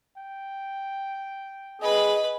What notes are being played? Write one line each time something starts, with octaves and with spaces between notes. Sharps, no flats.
G5
G#4 B4 D#5 B5